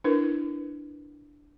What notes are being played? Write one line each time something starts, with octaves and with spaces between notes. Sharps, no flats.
D4 E4 A#4 B4